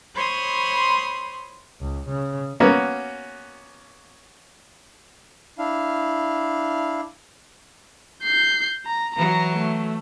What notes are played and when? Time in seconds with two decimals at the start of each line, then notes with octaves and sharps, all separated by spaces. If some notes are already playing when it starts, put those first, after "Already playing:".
0.15 C5 C#5 B5 C6 D#6
1.80 C#2
2.09 C#3
2.60 A#3 B3 C#4 F#4
5.58 D4 E4 F5
8.24 G6 C7
8.86 A#5
9.16 E3 F#3 A#5
9.53 A3